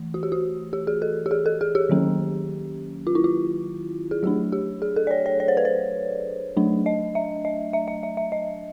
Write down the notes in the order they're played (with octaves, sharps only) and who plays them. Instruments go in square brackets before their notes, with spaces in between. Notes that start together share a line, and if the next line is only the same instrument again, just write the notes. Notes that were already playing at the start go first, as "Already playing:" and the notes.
Already playing: [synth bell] E3 A3
F#4
G4
F#4
G4
G#4
A4
G4
G#4
A4
G#4
G4
D#3 F#3 A#3 C#4
F4
E4
F4
G#4
F#3 A3 D4 G4
G4
G#4
A4
D5
C#5
C#5
C#5
C5
B4
C5
F#3 A3 D4
D#5
E5
D#5
E5
E5
E5
E5
D#5